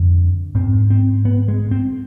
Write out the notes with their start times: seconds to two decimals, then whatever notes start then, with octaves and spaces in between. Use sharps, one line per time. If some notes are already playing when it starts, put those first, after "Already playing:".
Already playing: F2 D3
0.55 G#2 C4
0.90 C4
1.25 B3
1.48 G#3
1.71 C4